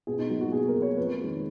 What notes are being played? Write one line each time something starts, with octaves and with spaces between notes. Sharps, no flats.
B2 G#4
D#4
F#3 A#3
F#4
B2 G#4
A#4
F#3 A#3
C#5
F2 B4
D#3 G#3